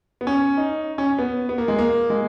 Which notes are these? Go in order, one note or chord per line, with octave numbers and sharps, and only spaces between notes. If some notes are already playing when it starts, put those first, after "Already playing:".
B3
C#4
D#4
C#4
B3
B3
A#3
G#3
A#3
G#3